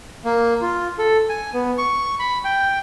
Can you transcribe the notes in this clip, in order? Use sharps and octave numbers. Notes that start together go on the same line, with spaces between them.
A#3
F4
A4
G#5
B3
C#6
B5
G5